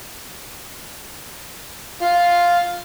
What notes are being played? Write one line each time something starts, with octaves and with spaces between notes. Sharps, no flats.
F4 F5